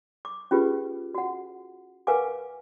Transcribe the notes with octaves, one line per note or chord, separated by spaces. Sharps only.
D6
C#4 F4 G4 G#4 B4
F#4 F#5
A#4 B4 F5 F#5 G#5 D6